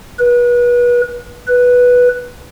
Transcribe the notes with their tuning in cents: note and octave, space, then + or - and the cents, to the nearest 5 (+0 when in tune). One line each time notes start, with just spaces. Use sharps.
B4 -30
B4 -5